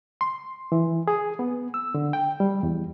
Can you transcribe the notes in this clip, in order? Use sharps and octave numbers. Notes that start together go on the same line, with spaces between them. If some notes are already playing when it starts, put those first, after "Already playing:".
C6
E3
G#4
B3
E6
D3
G5
G3
E2